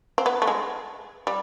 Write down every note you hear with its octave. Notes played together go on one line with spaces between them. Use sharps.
C4
B3
A3
G#3
G3